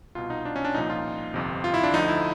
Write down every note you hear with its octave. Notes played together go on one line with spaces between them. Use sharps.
C2 B2 F4
D#4
D4
C#4
D4
C2 A#2 F3 D#4
F4
G1 F2 C3
F4
E4
D4
D2 D3 F3 D#4
E4